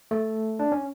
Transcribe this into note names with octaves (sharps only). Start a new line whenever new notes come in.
A3
D4
C#4